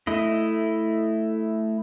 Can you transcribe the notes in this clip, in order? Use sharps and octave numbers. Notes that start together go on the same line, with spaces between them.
A3 E4 D#5